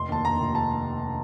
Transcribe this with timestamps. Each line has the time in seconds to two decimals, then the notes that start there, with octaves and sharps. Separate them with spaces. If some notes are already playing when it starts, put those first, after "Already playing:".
Already playing: F1 C6
0.09 D#2 A5
0.25 F1 A#5
0.40 F1
0.55 A5